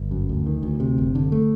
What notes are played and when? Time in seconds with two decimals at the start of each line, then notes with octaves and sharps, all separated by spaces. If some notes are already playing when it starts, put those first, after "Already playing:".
Already playing: G1
0.11 F#2
0.29 D2
0.46 D#3
0.63 D2
0.80 C3
0.98 F#1
1.15 D3
1.32 A3